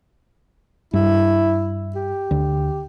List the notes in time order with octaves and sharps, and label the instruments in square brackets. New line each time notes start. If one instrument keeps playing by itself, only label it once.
[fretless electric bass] G2 [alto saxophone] E4
[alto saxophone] G4
[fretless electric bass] D2